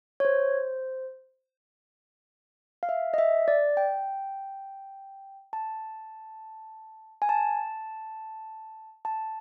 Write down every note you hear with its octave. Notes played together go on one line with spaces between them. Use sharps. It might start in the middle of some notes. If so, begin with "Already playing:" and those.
C#5
C5
F5
E5
D#5
E5
D5
G5
A5
G#5
A5
A5